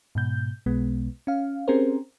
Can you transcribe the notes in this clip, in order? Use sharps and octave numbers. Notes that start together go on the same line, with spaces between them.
G#2 B2 G6
B1 B2 G#3 B3
C#4 F5
C4 C#4 G4 G#4 A#4 C5